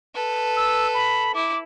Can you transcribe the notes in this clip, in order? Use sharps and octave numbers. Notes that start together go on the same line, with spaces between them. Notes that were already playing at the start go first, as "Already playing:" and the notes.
A4 B4
E6
B5
E4 D6